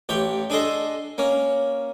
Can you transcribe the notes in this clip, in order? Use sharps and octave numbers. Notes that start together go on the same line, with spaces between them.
A1 G4 C#5 G5
D4 G#4 A4 D#5 C6
A#3 C#4